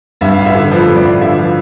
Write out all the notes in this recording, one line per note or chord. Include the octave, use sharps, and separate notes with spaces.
G2 E5
F5
A1
E5
D3
F3 B4
A4
G2 B4
D5
A1
D3 E5
F3 F5